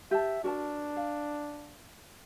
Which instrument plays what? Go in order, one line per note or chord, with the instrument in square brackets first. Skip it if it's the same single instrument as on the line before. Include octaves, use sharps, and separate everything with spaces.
[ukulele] G4 A5 [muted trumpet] E5
[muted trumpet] D4 [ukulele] F#4 A#4 A5
[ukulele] F5